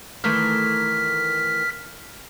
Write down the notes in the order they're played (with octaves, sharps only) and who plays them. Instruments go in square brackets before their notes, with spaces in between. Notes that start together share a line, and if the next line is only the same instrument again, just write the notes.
[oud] D#3 E3 A3 [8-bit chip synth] F6 B6